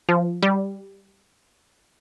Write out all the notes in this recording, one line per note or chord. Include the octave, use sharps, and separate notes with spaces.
F3
G3